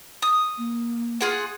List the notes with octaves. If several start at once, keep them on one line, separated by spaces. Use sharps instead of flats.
D#6
A#3
F4 G#4 F#5